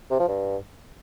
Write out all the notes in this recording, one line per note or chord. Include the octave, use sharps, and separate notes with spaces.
C3
F3
G2